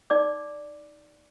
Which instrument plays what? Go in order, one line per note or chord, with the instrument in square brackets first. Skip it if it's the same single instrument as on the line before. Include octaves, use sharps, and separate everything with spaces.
[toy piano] D#4 D5 D6